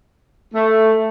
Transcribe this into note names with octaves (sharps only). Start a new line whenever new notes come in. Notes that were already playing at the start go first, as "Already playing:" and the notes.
A3